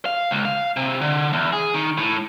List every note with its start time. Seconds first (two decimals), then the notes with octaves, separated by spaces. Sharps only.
0.06 F5
0.31 C#2
0.45 F5
0.77 C3
1.01 D3
1.33 E2
1.53 G#4
1.74 D#3
1.98 A2